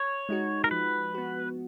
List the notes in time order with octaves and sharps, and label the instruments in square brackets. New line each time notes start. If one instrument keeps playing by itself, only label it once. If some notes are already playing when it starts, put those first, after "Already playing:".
Already playing: [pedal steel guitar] C#5
[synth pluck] G#3 D#4 F#4
[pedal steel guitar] A#4
[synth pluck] F3 [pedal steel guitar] B4
[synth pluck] B3 F#4